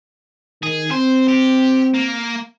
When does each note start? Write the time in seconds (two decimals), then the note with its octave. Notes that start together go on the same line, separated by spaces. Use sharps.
0.63 D#3 G#4
0.91 C4 C5
1.29 G4
1.94 A#3